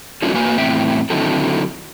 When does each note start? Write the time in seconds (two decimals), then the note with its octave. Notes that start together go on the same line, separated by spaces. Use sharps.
0.22 F#3 A3 C#4 D4 F4
0.34 A#3 F#4 B4 G#5
0.58 E2 A2 C4 E5 G5
1.10 D3 D#3 F#3 C4 E4 A4